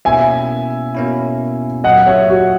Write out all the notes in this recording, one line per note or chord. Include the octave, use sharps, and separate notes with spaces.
B2 A#3 C#4 E4 E5 G#5
B2 A#3 C#4 E4
A#2 F#3 A#3 D#5 F#5
C#5 E5
F#4